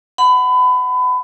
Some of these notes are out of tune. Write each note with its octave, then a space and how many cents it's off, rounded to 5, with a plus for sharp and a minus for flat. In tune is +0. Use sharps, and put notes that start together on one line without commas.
F#5 +0 B5 +30